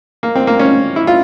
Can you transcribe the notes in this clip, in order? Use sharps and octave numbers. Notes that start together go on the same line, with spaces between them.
A#3
C4
A#3
C#4
E4
F4